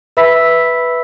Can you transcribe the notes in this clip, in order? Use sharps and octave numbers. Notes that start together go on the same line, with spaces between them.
B4 E5 B5 E6 B6